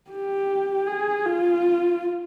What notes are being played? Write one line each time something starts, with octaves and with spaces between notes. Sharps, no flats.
G4
G#4
F4